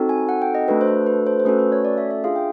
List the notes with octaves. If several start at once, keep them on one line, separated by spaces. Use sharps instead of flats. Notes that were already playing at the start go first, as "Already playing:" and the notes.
Already playing: C4 D#4 F#4 A4
G#5
F#5
G5
D#5
A3 D4 F#4 A4 B4
C5
B4
B4
C5
C5
A3 C#4 F#4 A4 B4
B4
C#5
D5
E5
E5
D4 F4 G#4 F5
G5